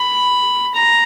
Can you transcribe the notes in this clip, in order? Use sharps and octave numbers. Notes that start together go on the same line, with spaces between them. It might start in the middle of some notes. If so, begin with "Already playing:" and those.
Already playing: B5
A#5